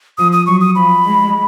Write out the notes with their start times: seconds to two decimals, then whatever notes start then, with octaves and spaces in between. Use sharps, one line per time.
0.18 F3 D#6
0.32 D#6
0.46 F#3 C#6
0.61 D#6
0.75 F3 B5
1.05 G#3